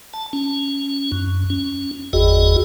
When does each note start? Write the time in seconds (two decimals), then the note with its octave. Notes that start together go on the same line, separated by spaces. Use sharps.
0.14 A5
0.33 C#4
1.12 F#2
1.50 C#4
2.13 G1 E2 F#4 G#4 D#5